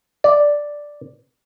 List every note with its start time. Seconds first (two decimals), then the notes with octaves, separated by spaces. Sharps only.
0.24 D5